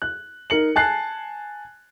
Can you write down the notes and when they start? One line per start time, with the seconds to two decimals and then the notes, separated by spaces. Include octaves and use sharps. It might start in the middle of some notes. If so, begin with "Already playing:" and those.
0.02 F#6
0.50 D#4 A#4 C#7 F#7
0.76 G#5 A5 F#6 C7